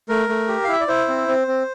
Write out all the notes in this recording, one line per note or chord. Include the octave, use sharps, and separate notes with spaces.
A3 A#4
A3
G4
F5
E4 E5
D5
E4 C5
C4
C4
C4